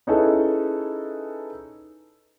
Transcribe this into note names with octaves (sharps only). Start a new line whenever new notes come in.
C#4 D#4 E4 G#4 A4 B4